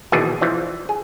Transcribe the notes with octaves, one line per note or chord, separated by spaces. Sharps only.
A#1 D#2 B2 E3 G#4 A5
E3 F3 D4
G#4